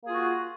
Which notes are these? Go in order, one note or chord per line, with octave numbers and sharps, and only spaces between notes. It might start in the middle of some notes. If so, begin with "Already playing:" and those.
A#3 F4 F#4 G#4